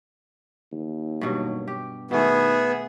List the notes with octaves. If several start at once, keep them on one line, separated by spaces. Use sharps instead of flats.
D#2
G2 B2 F#3
G4
B2 D#3 A3 B3 G#4 E5